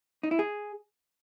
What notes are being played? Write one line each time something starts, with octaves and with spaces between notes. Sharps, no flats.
D#4
E4
G#4